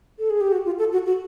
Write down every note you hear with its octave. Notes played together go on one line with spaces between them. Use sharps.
A4
G#4
G4
F#4
F4
A4
F#4
F#4